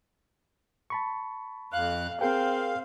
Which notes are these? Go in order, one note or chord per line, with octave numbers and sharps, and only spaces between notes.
A5 B5 C#6
F2 F5 F#6
C4 G#4 A#4 F5 G5